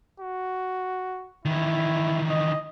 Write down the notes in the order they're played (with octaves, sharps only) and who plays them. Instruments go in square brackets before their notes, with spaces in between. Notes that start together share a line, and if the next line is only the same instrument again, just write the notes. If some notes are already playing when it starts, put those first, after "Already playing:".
[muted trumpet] F#4
[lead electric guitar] D#3 E3 [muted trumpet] E4
[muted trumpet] D#5